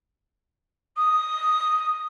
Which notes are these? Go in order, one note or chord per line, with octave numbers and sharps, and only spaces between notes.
D#6